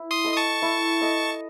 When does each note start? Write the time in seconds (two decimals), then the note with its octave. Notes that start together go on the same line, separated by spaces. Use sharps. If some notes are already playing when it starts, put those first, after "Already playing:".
Already playing: E4
0.11 C6 D#6
0.24 A4 D#5
0.32 D#6
0.37 A5 C#6
0.62 E4
1.01 A4 D#5